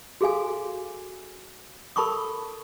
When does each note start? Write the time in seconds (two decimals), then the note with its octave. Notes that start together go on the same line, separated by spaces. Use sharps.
0.21 F#4 G#4 A4 F5 G#5
1.96 A4 A#4 A5 B5 C#6 D#6